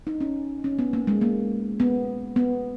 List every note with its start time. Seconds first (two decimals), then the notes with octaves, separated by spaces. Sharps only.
0.07 D#4
0.21 C#4
0.64 C#4
0.79 B3
0.93 A#3
1.07 G#3
1.21 A#3
1.80 B3
2.36 B3